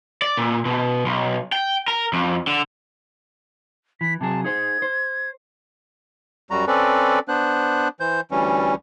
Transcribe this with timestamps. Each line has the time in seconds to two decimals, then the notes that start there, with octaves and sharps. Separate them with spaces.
0.22 D5
0.37 A#2
0.65 B2
1.06 B1
1.52 G5
1.88 A#4
2.13 F2
2.47 D3
4.01 E3 B6
4.21 C3 F#3 G#4 A5
4.44 D#4 G#4 C5 G#6
4.82 C5
6.51 F#2 G3 F#4 A#5
6.67 C4 C#4 A4 B4 D5
7.28 B3 D4 C5 F#6
8.00 E3 C5 G6
8.31 D2 E3 G3 C#4